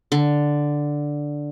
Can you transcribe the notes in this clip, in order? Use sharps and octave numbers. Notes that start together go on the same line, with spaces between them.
D3